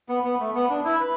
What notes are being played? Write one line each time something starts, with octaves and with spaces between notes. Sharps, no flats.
B3
B3
A3
B3
D4
E4
B4